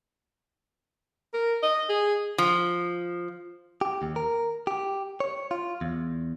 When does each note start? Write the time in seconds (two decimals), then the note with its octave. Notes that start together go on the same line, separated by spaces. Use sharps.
1.34 A#4
1.63 D#5
1.89 G#4
2.38 F3
3.81 G4
4.02 D#2
4.16 A#4
4.67 G4
5.20 C#5
5.51 F4
5.81 E2